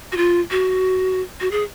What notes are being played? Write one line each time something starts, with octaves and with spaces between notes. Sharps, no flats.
F#4
F4
F#4
F#4
G#4